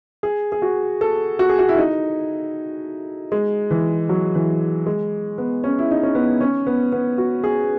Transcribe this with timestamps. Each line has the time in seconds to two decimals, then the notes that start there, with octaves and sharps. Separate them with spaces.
0.23 G#4
0.52 G#4
0.62 F#4
1.01 A4
1.39 F#4
1.49 G#4
1.59 F#4
1.69 E4
1.78 D#4
3.32 G#3
3.70 E3
4.09 F#3
4.35 E3
4.86 G#3
5.38 B3
5.64 C#4
5.79 E4
5.91 D#4
6.03 C#4
6.15 B3
6.41 C#4
6.67 B3
6.92 B3
7.18 F#4
7.44 G#4